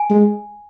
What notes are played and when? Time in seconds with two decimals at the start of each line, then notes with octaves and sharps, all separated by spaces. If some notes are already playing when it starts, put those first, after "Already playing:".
Already playing: G#5
0.10 G#3